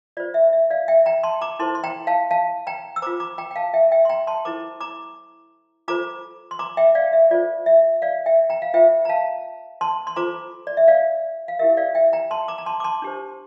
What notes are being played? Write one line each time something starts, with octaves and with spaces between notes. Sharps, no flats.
F4 C5 D5
E5
E5
D5 F5
E5 G5
G5 A#5
A5 C6
A#5 D6
E4 A4 C5 A5 C6
C6
G5 A#5
F5 A5
F5 A5
G5 A#5
E6
F4 C5 A#5 D6
A#5 D6
G5 A#5
G5
F5 A5
E5 G5
E5 G5
C6
G5 A#5
A5 C6
E4 A4 C5 A#5 D6
A#5 D6
F4 A4 C5 A#5 D6
C6
A#5 D6
E5 G5
D5 F5
E5
F4 A4 C5 D5
E5
D5 F5
E5 G5
G5 A#5
F5
F4 A4 C5 E5 G5
A#5
F5 A5
A5 C6
C6
F4 A4 C5 A#5 D6
D5
E5
D5 F5
F5
E4 G4 A#4 E5
D5 F5
E5 G5
G5 A#5
A5 C6
A#5 D6
A#5
A5 C6
D6
A5 C6
D4 G4 C5